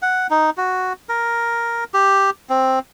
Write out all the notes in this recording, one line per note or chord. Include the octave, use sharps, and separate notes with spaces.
F#5
D#4
F#4
A#4
G4
C4